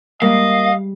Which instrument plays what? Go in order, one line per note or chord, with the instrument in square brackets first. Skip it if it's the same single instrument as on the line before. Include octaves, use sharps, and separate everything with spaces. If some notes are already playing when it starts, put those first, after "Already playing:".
[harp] G3 G#3 B6 [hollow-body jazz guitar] A#3 [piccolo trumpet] D#5 [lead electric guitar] F5